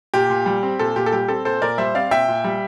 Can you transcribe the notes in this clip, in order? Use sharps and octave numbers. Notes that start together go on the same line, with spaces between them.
A#2 G4
A#2
G3
C4
A#2 A4
A#2 G4
A4
G3 G4
C4 A4
A#2 A4 C5
A#2 A#4 D5
G3 C5 E5
C4 D5 F5
A#2 E5 G5
A#2
G3